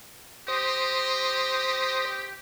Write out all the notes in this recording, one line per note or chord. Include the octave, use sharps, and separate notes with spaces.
G4 C5 D#6 A#6